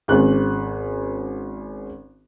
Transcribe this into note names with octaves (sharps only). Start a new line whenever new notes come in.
G#1 G#3 C#4 F#6